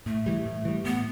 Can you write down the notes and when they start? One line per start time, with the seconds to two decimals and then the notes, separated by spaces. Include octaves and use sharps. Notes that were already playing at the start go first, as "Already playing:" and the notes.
0.06 A2 A3
0.26 E3 G3
0.45 A2
0.65 E3 G3
0.84 A2 B3